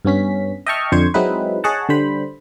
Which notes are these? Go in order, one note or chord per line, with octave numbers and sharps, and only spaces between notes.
G2 B3 C#4 B6
D#5 E5 G5 A5 C#6 F6
F2 D3 C5 C#6 G#6
F#3 G#3 C4 D#4 E4 B4
G#4 C#5 D#5 F#5 A5
D3 G3 C5 B5